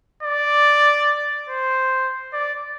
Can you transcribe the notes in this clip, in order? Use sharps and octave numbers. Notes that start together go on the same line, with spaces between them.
D5
C5
D5